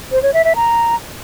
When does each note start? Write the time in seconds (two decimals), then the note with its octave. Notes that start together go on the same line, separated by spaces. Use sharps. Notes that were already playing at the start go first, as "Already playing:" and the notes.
0.12 C5
0.23 C#5
0.34 E5
0.45 E5
0.55 A#5